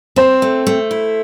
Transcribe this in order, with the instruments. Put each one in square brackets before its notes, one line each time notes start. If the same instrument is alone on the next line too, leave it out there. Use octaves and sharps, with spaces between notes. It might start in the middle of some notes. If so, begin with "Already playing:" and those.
[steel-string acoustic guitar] C4 [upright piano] C5
[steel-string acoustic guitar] A3
A3
E4